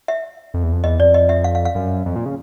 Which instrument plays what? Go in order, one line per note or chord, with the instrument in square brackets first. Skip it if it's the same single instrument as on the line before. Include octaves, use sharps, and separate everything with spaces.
[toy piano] E5
[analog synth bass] F2
E2
F2
[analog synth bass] E2 [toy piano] D#5
[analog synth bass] F2 [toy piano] D5
[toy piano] D#5
E5
F5
F5
F5
[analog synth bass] F#2
F2
A#2
C#3